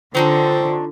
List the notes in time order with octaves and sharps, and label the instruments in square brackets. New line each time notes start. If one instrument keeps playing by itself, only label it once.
[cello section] D3 [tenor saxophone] C4 [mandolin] D4 D#4 C#5 [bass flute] F4